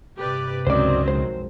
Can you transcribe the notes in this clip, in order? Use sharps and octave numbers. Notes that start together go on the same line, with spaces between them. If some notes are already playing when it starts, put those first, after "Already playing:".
G2 C3 G4 B4 D5
C#2 D#3 F#3 C4 C#4 C5 D5
B1 F2 G#3 C5